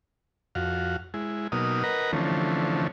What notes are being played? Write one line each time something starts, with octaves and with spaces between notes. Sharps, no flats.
F2 F#4 F5
G#3 E4
B2 F#3 A#3 D#4 D#6 F6
A#4 B4 D#5 F#5 A#5
D3 E3 F3 A3 C4 C#4